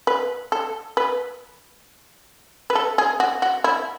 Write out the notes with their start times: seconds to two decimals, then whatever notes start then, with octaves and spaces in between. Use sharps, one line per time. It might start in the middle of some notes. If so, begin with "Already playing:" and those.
0.07 B4
0.52 A4
0.97 B4
2.70 B4
2.75 A4
2.98 G#4
3.20 F#4
3.42 F#4
3.64 E4